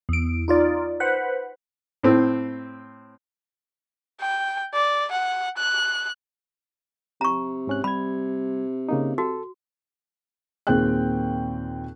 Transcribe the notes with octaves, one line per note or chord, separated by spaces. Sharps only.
E2 D7
D#4 F4 D5
B4 C5 F#5
A2 C4
G5
D5
F#5
F#6
C3 A#5 C#6
G#2 C#4 F#6
G3 B5 G#6
C#3 A#3 D#4
F#4 A4
D#2 A#2 C4 G#4 G5 F#6